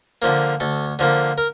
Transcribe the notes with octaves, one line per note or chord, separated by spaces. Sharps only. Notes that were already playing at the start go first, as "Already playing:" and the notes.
D3 F3 A#3
D2 A4
D3 F3 A#3
A#4